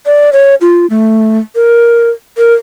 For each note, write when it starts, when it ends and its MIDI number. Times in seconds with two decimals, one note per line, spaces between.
0.06 0.30 74
0.33 0.55 73
0.61 0.86 65
0.90 1.39 57
1.55 2.10 70
2.38 2.53 70